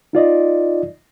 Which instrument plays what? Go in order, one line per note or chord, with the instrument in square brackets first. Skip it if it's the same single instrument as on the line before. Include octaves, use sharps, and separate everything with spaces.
[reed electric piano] D#4 F4 D5 D#5